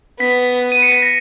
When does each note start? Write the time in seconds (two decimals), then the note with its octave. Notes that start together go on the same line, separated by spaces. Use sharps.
0.20 B3 B6
0.72 D#7
0.82 C#7
0.92 B6
1.02 A#6